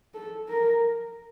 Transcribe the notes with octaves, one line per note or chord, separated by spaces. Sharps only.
A4
A#4